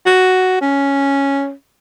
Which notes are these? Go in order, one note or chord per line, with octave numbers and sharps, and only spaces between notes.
F#4
C#4